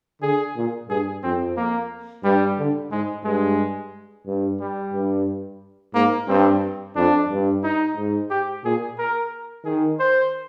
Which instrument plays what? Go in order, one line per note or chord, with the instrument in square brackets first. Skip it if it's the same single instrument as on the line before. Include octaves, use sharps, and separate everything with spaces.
[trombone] D3 [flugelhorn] G#4
[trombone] A#2
[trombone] G2 [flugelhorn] G#4
[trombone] F2 [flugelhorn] C4
[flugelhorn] A#3
[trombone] G2 [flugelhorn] G3
[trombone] D3
[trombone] G#2 [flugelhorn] G#3
[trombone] G2 [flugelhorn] G#3
[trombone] G2
[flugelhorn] G3
[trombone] G2
[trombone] G#2 [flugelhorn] A#3
[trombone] G2 [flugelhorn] C4
[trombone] F2 [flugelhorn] D4
[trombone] G2
[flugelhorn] D#4
[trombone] G#2
[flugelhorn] G4
[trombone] A#2 [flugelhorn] G#4
[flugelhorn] A#4
[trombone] D#3 [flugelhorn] G#4
[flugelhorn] C5